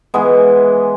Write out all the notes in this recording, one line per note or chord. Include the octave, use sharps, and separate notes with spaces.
E3 G#3 B3